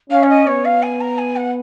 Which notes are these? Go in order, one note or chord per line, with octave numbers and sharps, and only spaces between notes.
C#4 F5
C#5
D#5
B3 C#5
F5
G#5
A#5
G#5
F#5